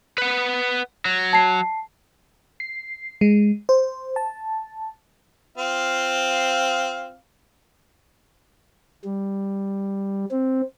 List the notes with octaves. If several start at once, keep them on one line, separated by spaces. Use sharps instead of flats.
B4 F#5
F#3
A5 C7
C7
G#3
C5
A5
C4 F4 F5
G3
C4